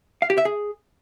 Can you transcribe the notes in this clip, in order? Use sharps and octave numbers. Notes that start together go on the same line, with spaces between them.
F5
G4
E5
G#4